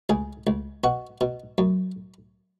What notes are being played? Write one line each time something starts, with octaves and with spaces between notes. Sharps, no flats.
C#2 G#4
C#2
B2 F#4
B2
F#2